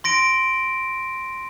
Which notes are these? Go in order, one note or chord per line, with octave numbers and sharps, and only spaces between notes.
C6 A#6 D7